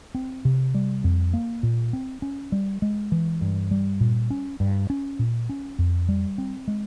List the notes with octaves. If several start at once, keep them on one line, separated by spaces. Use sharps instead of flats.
C4
C3
G3
F2
A#3
A#2
C4
C#4
G3
G#3
E3
G2
G3
A#2
C#4
G2
C#4
A#2
C#4
F2
G3
C4
G#3